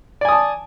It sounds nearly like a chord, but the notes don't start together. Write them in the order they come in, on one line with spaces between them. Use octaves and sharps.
D5 G#5 D#6 A5